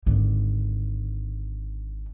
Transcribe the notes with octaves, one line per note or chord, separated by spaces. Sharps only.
G#1 D3